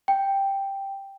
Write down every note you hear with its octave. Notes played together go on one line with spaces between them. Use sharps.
G5